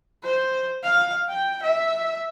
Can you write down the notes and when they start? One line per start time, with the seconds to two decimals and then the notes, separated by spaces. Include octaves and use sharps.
0.23 C5
0.83 F5
1.29 G5
1.62 E5